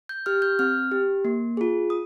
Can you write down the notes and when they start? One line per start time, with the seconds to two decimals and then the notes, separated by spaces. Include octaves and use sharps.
0.09 G6
0.26 G4 F6
0.42 G6
0.59 C4 F6
0.91 G4
1.25 A#3
1.57 F4 G#4
1.90 D#6